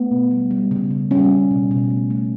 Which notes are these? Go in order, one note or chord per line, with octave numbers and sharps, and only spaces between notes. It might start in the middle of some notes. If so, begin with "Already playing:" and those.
Already playing: A3 B3
B2
G3
G3
C#3
C#3
G3 C#4
G3
B2
B2
A3
A3